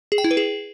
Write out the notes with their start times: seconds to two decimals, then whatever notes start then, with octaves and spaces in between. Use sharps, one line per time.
0.12 G#4
0.18 G5
0.24 E4
0.31 B4
0.37 G#4